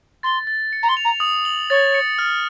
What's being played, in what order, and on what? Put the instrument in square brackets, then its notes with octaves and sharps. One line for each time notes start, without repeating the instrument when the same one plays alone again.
[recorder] C6 [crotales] A6
[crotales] A6
C#7
[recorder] A#5
C6
[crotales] F7
[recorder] A#5
[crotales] D#6
F#7
[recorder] C#5 [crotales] A6
[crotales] C#7
F6